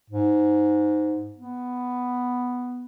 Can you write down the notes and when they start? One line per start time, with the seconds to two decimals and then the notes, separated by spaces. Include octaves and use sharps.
0.10 G#2
1.36 B3